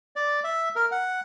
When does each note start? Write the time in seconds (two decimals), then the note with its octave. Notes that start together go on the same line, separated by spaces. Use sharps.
0.16 D5
0.44 E5
0.76 A#4
0.92 F#5